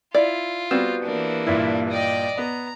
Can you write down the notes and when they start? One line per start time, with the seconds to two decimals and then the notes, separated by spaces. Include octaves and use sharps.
0.14 E4 F4 D5
0.71 G3 B3 C4 F#4
1.04 E3 A#3 D4
1.47 G2 A#2 E4
1.90 D5 D#5 G5
2.38 B3 A#5